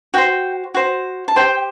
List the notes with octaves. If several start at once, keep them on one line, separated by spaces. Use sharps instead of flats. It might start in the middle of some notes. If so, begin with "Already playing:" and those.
F#4 C5 G5
F#4 C5
A5
G4 C5 G5